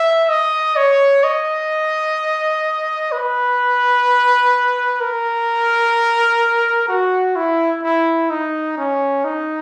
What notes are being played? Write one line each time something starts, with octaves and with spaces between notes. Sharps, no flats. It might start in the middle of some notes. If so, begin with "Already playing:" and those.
Already playing: E5
D#5
C#5
D#5
B4
A#4
F#4
E4
E4
D#4
C#4
D#4